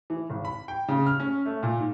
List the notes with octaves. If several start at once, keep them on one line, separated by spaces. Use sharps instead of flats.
E3
G#1
B5
G5
C#3
F6
C#4
A3
A#2
G#2